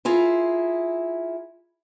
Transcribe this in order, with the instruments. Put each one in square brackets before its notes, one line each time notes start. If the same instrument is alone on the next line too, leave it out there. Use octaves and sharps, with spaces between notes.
[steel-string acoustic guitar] E4 F4 G#4 A#4